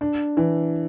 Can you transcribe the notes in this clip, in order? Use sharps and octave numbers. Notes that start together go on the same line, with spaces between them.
D4
E3